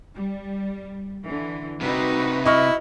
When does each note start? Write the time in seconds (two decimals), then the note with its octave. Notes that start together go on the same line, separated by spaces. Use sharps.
0.15 G3
1.24 D3 E3
1.80 C2 C3 D#4 F#4 B4
2.45 E4 D#5 C#6 F6